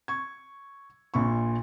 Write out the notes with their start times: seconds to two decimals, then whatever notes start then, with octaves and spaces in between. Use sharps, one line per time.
0.08 C#6 G#6
1.14 A#1 A#2 B5 C#6